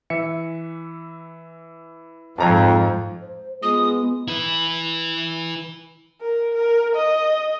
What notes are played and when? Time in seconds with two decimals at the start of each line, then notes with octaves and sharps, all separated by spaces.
0.10 E3 E5 C#7
2.38 F2 G#2 F3 A5 A#5 G#6
3.21 C5
3.63 G#3 B3 F4 D#6
4.28 E4 B4
6.21 A#4
6.55 A#4
6.96 D#5